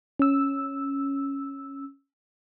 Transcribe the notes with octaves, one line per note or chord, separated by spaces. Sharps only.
C#4 E6